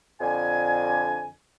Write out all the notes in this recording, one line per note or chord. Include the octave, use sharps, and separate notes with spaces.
F2 D3 G#5